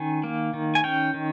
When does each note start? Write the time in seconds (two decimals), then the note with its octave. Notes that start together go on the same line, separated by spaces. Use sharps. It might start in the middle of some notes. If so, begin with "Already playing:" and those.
Already playing: D#3 C#4 G#5
0.24 A#3
0.54 D#3
0.75 G#5
0.84 C#4 G5
1.14 D#3